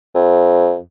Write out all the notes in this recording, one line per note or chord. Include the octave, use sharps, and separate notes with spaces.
F2